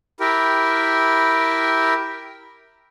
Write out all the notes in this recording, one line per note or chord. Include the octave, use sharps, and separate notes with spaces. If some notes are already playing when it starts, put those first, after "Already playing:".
E4 G4 A#4